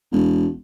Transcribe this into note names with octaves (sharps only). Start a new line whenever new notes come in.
E1